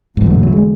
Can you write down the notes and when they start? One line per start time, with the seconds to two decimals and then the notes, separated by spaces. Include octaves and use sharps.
0.17 E2 G#2 D3 F#3
0.26 A2
0.34 B2
0.43 F#3
0.53 G#3